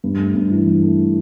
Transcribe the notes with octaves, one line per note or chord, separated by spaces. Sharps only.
G2
A3
G2
E3
G2
A3